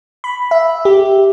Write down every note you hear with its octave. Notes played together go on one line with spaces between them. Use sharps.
B5
E5
G4